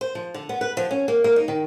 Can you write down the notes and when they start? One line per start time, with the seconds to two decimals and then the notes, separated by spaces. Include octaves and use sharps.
0.01 C5
0.15 F3
0.34 D3
0.49 B3
0.61 B4
0.77 F3
0.91 C#4
1.08 A#3
1.24 A#3
1.36 D#4
1.48 D#3